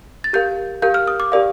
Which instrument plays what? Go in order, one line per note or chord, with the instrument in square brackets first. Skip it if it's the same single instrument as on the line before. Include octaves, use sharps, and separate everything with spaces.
[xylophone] A6
G4 A#4 F5 G6
G4 A#4 F5 G6
F6
D#6
D6
G4 A#4 D5 F5